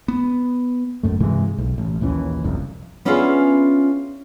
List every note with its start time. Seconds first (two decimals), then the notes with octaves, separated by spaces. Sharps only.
0.08 B3
1.03 G1 F#2 A3
1.20 G2 C3 E3 G#3
1.58 B1
1.78 A1
2.01 A#1 D#2 E3 C#4
2.44 F#1 C2 F2
3.05 B3 C#4 D4 E4 F4 G#4